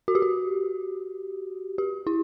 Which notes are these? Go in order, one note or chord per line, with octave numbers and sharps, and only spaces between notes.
F#4
G4
F#4
G4
E4